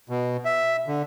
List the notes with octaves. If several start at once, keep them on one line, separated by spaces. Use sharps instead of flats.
B2
E5
D3